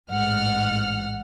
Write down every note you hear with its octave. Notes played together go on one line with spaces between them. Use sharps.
A1 G#2 F#5 F6